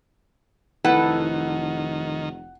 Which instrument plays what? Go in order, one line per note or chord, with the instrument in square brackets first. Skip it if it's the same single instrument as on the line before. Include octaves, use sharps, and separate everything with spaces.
[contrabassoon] F1 [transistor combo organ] D#3 [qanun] E4 A4 B4 [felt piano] F#5